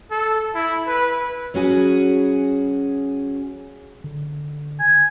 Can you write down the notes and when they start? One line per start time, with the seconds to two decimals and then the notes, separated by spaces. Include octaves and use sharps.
0.11 A4
0.55 E4
0.88 B4
1.54 F#3 C#4 F#4 G#4
4.04 D3
4.80 G#5